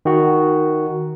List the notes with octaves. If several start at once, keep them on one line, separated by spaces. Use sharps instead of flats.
D#3 F#4